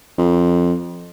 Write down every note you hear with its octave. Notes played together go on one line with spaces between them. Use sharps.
F2